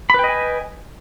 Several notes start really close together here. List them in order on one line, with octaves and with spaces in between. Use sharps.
B5 B4 G5 D#5 G#5